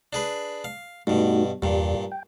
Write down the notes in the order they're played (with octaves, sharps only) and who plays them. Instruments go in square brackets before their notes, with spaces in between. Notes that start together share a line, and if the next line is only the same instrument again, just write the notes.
[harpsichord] D4 G#4 B4
F5
[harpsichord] G2 B2 [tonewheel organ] A3 D#4 F#4
[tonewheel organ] E2 G4 [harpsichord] G2 A#2
[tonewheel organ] G5